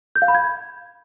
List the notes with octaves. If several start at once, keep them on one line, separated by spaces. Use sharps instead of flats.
G6
F5
B5
G#6